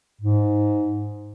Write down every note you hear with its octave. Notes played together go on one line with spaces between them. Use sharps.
G#2